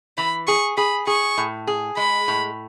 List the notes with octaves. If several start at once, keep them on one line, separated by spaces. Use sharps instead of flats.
E3 B5
G#4 C#6
G#4 B5
G#4 C#6
A2
G#4
G#3 B5
A2